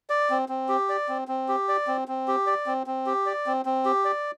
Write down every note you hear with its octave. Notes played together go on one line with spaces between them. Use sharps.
D5
C4
C4
G4
D5
C4
C4
G4
D5
C4
C4
G4
D5
C4
C4
G4
D5
C4
C4
G4
D5